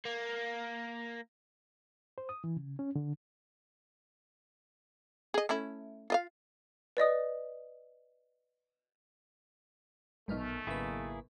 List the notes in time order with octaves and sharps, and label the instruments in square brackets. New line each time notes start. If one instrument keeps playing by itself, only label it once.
[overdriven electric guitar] A#3
[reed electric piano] C5
D#6
E3
C#3
C#4
D3
[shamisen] G#4 D#5
A3 C#4 E4
F4 D#5 F5
[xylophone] B4 D5 D#5 D#6
[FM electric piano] A#1 B3 F6 [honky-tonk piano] F#2 B2 D#4 [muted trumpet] A3
[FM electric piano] G#1 C#3 B4 [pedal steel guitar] A#3 E4 G#4